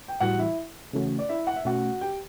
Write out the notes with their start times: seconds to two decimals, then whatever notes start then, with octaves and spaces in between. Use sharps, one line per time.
0.08 G5
0.20 A2 E3 G3 F#4 F#5
0.39 E4 E5
0.93 C#3 E3 A3 C#4 F#4
1.19 D5
1.29 E4 E5
1.47 F#5
1.56 E5
1.65 B2 A3 C#4 F#4 F#5
2.01 G4 G5